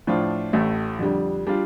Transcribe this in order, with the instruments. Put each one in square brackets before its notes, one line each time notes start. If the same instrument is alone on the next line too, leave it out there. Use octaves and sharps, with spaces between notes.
[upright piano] A2 F3 D4 F4
A1 A2 A3
F2 D3 G3
G3 D4 F4